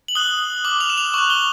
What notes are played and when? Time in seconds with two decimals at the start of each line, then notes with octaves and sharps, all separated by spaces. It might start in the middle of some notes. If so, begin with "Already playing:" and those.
0.08 F#7
0.15 D#6 F#6 G7
0.65 D6 F6 F#7
0.81 F7
0.90 E7
0.97 F7
1.14 C#6 F#6 F#7
1.30 G7